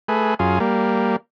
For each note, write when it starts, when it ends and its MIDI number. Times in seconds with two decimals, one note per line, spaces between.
0.08 0.34 57
0.08 0.34 68
0.08 0.34 71
0.39 0.59 42
0.39 0.59 65
0.39 0.59 68
0.60 1.16 55
0.60 1.16 58